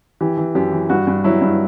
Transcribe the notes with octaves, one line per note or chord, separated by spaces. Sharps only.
E3 G4
E3
F#2 G4
E3
G2 F#4
G2
F#3 E4
G2